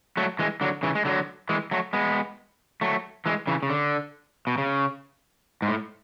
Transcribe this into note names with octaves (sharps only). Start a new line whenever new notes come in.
F#3 A3
E3 G#3
D3 F#3
C#3 E3
G#3
D3 F#3
E3 G#3
F#3 A3
G#3 B3
F#3 A3
E3 G#3
C#3 E3
C#3
D3
B2
C#3
G#2
A2